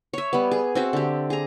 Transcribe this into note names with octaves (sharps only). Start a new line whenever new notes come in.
C#5 E5
G3 B3
G#4
C4 F#4 E5
D3 G4
G#4 A#5